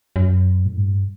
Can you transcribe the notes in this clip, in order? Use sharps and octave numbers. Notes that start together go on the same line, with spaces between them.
F#2
A2
G2